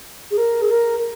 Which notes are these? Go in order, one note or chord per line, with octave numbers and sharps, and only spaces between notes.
G#4
A#4
G#4
A#4